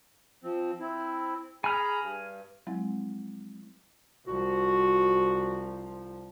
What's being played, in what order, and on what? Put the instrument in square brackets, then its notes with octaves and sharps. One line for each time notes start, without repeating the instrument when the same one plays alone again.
[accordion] F3 C4
C4 E4
[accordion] G#4 A#5 B5 [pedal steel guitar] G#5 F6
[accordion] G2
[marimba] F3 F#3 G#3 C4 E4
[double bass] C2 F3 [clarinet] F#4